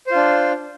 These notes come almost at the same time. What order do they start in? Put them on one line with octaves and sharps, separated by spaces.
C5 F4 D4